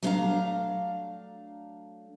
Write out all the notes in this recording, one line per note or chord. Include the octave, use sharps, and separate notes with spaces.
F#3 A3 D4 D#5 F5 A#5